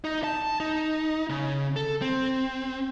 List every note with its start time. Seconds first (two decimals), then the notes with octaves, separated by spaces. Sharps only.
0.04 D#4
0.24 A5
0.60 D#4
1.29 C#3
1.76 A4
2.01 C4